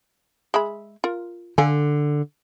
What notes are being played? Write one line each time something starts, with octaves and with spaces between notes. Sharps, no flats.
G#3 E5 B5
F4 A#4
D3 A4 F5 G#5